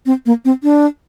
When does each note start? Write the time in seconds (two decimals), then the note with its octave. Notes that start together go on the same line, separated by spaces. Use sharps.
0.06 C4
0.26 A#3
0.45 C4
0.63 D4